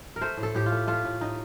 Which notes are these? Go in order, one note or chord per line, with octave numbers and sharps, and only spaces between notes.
A#4
A3 C5
A2
A4
A2 G4
F4
A3
A3 F4
A2
A2 D#4